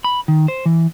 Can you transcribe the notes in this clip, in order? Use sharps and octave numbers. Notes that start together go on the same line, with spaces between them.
B5
D#3
C5
E3